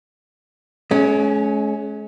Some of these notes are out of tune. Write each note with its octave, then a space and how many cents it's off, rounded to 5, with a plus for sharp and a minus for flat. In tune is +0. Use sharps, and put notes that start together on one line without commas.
G#3 +40 C#4 +0